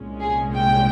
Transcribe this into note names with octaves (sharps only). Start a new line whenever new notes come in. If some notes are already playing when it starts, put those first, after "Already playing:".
Already playing: C2 A#2 G#3 C#4
G#4
G5